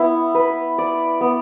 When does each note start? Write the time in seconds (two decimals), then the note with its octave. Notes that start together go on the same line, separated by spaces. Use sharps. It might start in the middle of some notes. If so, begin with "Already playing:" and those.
Already playing: B3 E4
0.35 B4
0.78 D5
1.21 B3